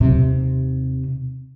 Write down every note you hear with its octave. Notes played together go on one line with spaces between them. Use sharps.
D#2 C3